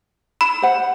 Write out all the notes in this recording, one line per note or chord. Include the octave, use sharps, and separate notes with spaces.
B5
C5 F#5